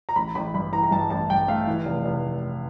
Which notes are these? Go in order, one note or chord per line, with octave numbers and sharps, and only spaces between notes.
A#5
A1 B5
A1 B5
G2 B5
E3 A#5
A#5
G2 A5
A1 A5
G2 G5
A3 F5
E3
F1
F1